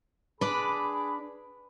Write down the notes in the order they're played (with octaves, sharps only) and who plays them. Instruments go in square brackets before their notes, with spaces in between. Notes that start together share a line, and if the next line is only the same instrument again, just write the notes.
[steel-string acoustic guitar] D4 D5 [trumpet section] G#4 B5 [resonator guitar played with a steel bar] B4